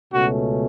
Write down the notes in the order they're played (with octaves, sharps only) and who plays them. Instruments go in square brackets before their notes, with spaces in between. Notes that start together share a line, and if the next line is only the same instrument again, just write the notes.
[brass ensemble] C#2 B2 A3 C#4 F#4